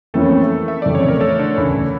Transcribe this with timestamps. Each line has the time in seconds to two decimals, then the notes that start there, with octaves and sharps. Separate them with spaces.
0.14 F2 E3 A3 A#3 C#4 E4 A4
0.68 E5
0.82 F1 F2 C#3 E3 D5
0.95 C#5
1.08 A#4
1.21 A3 A4
1.39 D3 D4
1.56 E1 D2 C#3 E3 E4